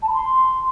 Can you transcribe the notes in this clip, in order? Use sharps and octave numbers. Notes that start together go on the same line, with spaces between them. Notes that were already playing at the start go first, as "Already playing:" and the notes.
A5
B5
C6